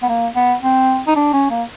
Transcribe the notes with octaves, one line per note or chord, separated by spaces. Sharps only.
B3
A#3
B3
C4
D#4
D4
C#4
A#3